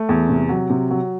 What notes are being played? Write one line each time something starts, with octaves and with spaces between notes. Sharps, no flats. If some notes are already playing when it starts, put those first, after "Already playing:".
Already playing: A3
E2
C3
F#3
C3
F#3